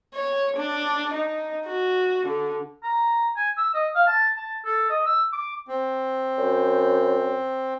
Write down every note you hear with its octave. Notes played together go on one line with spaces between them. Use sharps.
C#5
D4
D#4
F#4
D3
A#5
G#5
E6
D#5
F5
A5
A5
A4
D#5
E6
D6
C4
F#2